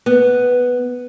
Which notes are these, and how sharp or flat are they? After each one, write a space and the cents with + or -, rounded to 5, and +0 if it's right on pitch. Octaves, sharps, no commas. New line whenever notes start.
B3 +0